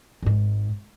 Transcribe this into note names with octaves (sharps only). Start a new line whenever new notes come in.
G#1 G#2